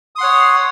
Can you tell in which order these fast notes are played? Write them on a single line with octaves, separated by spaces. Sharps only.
D#6 C6 F#5 C#5